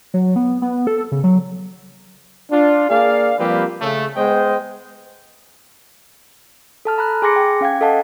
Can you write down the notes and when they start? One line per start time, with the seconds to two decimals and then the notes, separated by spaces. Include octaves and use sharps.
0.14 F#3
0.36 B3
0.62 B3
0.87 A4
1.12 C#3
1.24 F#3
2.51 D4 F4
2.89 A#3 G#4 D5 F5
3.37 F3 G3 A#3 C4 G4 B4
3.81 C#3 A3
4.16 G#3 B3 C5 D#5 G5
6.85 A4 A5 F6
6.98 A#5 B5 F#6
7.22 G#4 G#5 C6 D6 A#6 C#7
7.36 G5 G#5
7.61 C#4 F5 G5 G#6
7.81 A4 D#5 F5 F#5 A5